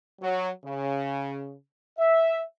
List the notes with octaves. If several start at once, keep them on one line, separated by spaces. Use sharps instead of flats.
F#3
C#3
E5